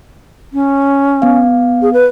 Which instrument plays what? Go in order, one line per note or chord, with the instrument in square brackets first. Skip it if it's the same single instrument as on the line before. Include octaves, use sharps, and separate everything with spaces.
[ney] C#4
[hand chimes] B3 F5
[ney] G#4
B4